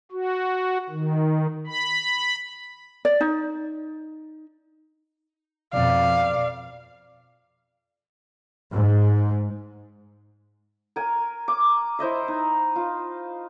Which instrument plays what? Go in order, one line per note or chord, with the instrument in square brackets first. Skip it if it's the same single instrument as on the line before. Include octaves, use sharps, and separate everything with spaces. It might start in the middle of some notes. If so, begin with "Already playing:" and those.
[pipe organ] F#4
D#3
B5
[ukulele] D5
D#4
[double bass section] F2 B2 [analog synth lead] D5 [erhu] F5
[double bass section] G#2
[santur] A#4 G#5
D6
E4 C5 D#5 E5
D#4
F4